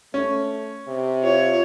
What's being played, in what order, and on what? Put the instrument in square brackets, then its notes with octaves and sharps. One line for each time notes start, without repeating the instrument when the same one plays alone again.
[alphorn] A3 [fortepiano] C#4
[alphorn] C3
[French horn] F4 [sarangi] C#5